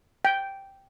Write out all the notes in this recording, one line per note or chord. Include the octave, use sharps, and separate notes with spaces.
G5